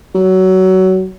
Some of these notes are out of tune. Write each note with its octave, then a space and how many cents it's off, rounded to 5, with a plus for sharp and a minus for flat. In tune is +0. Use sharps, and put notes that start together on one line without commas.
F#3 +20